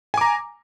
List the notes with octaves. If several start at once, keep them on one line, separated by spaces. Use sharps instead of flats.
G#5 A#5 D6